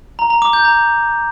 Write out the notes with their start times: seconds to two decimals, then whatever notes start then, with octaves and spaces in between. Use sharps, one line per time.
0.19 A#5
0.30 A#5
0.42 D6
0.53 G6
0.65 A#5